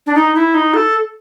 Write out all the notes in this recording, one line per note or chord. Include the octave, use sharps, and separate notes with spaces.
D4
D#4
E4
D#4
A4